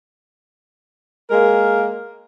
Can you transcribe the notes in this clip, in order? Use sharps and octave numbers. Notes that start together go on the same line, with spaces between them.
G#3 A#3 A#4